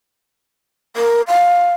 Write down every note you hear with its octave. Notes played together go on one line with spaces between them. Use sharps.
A#4
F5